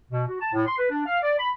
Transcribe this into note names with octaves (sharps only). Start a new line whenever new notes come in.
B2
F#4
A5
A2
C6
B4
D4
F5
D5
B5